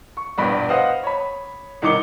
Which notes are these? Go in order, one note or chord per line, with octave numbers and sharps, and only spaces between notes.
C#6
A#1 E2 G2 B2 D5 B5
B4 C5 D#5 F5 F#5 D#6
C#5 B5
C2 D#3 D#4 D6 C#7 G7